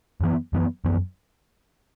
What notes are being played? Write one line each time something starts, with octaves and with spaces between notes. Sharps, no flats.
F#2 E3 B3
F#2 E3 B3
F#2 E3 B3